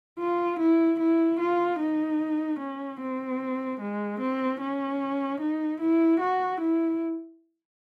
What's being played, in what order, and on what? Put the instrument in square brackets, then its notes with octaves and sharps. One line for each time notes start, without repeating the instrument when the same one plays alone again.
[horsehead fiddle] F4
E4
E4
F4
D#4
C#4
C4
G#3
C4
C#4
D#4
E4
F#4
E4